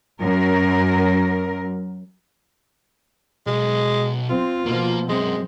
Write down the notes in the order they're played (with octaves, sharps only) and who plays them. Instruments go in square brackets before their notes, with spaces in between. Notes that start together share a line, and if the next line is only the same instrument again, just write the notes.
[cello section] F#2 A#4
[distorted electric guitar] B1 [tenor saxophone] G#3
[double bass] C4 [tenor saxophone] F4
[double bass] B2 F3 [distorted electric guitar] A#3
[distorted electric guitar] F#2 [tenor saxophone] G#3 [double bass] C4